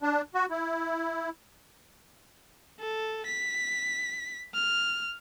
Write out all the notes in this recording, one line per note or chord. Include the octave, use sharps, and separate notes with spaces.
D4
F#4
E4
A4
B6
F6